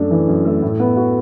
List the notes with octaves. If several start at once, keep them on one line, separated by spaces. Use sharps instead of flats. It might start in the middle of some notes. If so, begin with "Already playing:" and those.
Already playing: F#2 A3 D4
E3
F#2
A3
A2
B3
F#4